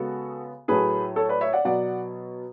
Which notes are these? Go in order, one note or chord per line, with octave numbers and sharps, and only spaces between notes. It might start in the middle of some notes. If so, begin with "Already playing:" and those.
Already playing: C#3 G#3 B3 F#4 A4
A2 F#3 A3 G#4 B4
A4 C#5
B4 D5
C#5 E5
D5 F#5
B2 F#3 B3 D5 F#5